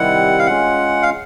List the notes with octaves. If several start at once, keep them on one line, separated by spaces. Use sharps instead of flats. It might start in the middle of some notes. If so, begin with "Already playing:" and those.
Already playing: C3 D#3 G3 C4 E4 F#5
F5
G#3 C#4 F4 F#5
F5